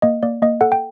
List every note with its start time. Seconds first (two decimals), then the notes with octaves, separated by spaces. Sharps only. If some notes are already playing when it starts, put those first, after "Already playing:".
0.02 A#3 D#5
0.23 A#3 D5
0.42 A#3 D#5
0.61 A4 F#5
0.72 G5